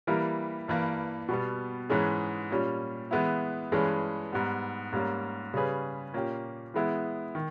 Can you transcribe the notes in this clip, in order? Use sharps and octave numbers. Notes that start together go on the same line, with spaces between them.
E3 G3 A#3 E4 A#4
G2 E3 A#3
B2 G3 B3
G#2 E3 G#3 C#4 G#4
A#2 G3 C#4
E3 G#3 B3 E4
G2 E3 G#3 C#4 G#4
G#2 G3 B3
G#2 G3 A#3 C#4
C#3 G3 C#4 G#4 B4
A#2 A#3 C#4 G4
E3 G#3 B3 E4
D#3